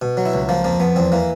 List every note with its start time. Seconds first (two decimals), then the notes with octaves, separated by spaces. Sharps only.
0.02 B2
0.17 F#3
0.26 E4
0.33 C#2
0.49 F3 A#3
0.64 F2 A#3
0.80 F2 B3
0.96 E2 C4
1.12 E3 A#3